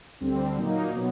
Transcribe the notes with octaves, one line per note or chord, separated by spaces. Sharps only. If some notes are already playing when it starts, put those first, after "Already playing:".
D2 D3 G3 C4
A#2 F#3 A#3 D#4
B2 F#3 B3